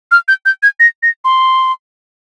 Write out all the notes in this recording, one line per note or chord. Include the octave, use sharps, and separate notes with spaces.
F6
G6
G6
G#6
A#6
A#6
C6